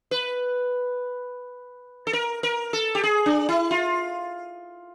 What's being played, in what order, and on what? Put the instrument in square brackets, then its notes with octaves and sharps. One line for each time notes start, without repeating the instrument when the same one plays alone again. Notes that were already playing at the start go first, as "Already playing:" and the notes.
[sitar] B4
A4
A#4
A#4
A4
G4
G#4
D4
E4
F4